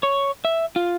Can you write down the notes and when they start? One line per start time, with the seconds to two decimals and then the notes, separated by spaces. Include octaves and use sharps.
0.03 C#5
0.45 E5
0.76 F4